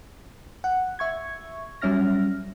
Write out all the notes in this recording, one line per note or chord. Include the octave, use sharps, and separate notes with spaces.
F#5
E5 C#6 G#6
F#3 G3 C#4 E5 F6 A#6